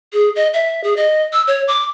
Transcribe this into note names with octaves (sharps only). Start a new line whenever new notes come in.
G#4
D#5
E5
G#4
D#5
E6
C#5
D6